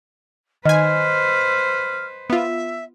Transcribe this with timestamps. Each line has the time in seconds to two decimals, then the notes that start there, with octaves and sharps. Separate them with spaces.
0.65 D#3 B4 C5 D#5 G#5 F6
2.30 B3 F4 E5